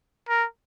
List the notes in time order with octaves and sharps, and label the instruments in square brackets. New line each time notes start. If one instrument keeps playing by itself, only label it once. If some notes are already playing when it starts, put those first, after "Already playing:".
[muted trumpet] A#4